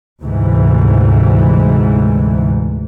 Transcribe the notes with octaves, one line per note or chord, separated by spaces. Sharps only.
D2 G#2 C3 E3